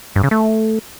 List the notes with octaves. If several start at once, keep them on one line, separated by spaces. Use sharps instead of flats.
G2
C#3
A3